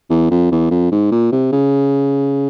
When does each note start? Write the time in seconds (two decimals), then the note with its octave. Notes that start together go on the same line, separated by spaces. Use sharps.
0.10 E2
0.31 F2
0.51 E2
0.71 F2
0.92 G#2
1.11 A#2
1.32 C3
1.52 C#3